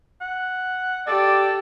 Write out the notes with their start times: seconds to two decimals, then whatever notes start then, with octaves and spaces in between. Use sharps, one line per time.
0.21 F#5
1.07 G4 A4 D5